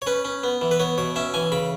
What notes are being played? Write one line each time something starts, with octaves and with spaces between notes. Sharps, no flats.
C#5
C#4 B4
C#4
B3
E3
B4
B3 C#5
B2 C#5
C#4 E5
E3 G#5
C#3 B5